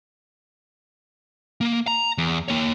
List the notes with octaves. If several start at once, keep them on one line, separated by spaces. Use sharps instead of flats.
A#3
A#5
E2
A#3 C#5